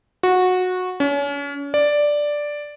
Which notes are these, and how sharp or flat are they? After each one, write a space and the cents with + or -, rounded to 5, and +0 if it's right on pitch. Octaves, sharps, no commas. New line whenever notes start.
F#4 -15
C#4 +35
D5 +0